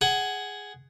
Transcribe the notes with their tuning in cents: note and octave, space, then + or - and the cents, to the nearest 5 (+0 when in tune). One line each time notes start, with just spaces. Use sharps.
G#4 +0 F#5 +15